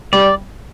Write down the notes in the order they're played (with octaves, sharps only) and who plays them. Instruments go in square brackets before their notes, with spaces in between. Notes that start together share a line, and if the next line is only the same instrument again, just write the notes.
[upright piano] G3 [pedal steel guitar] D5